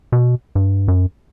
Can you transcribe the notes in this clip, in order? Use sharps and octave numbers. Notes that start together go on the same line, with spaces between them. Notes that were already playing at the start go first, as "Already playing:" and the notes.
B2
G2
F#2